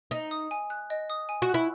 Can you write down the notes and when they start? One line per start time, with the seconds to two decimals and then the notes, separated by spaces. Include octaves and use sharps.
0.11 D#4 D#5
0.31 D#6
0.51 G#5
0.70 F#6
0.90 D#5
1.10 D#6
1.29 G#5
1.42 F#4
1.50 E4 F#6